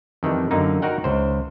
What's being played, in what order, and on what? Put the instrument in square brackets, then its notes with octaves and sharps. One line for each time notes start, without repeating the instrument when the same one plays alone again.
[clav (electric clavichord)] F2 D#3 E3 G3
F#2 D3 A#3 D#4
D#4 F#4 A#4 F#5 G5
C#2 C5